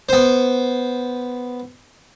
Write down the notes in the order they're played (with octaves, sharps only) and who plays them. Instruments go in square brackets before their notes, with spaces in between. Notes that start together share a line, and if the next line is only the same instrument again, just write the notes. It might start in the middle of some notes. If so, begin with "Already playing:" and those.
[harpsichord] B3 C5